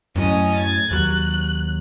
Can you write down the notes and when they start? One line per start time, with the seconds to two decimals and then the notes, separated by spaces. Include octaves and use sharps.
0.16 F#2 A2 F#3 C#4 D#5
0.55 G#6 A6
0.91 D#2 F#3 F#6